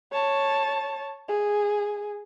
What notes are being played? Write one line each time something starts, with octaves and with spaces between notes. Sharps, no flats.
C#5 A5
G#4